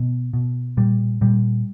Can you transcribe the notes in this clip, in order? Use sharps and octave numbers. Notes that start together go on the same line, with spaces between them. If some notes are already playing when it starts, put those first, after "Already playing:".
Already playing: B2
B2
A#2 G3
A#2 G3